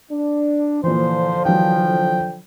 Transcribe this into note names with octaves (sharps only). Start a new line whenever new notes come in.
D4
A#2 D3 E3 F3 C5
E3 F#3 G5